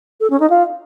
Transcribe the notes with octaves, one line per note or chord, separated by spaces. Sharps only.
A4
C#4
D#4
F4